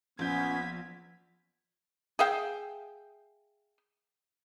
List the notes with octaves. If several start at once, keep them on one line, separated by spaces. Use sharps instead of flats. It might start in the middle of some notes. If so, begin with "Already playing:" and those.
A#1 B3 C#4 G6 G#6 B6
G#4 E5 F5 G5